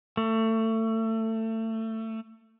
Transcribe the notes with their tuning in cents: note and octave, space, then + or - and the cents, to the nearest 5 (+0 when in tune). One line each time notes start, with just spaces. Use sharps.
A3 +25